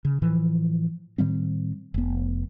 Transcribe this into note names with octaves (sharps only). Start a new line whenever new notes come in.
C#3
A2 E3 F3
A2 D#3 G3 C4
F1 B3